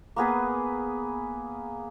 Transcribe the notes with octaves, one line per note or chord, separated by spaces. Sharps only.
A#3 B3 G#4 B4